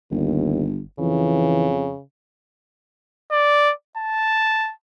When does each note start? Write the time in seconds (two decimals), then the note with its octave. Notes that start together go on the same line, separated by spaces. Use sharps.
0.11 G1 D#2
0.99 F2 C#3 E3
3.31 D5
3.97 A5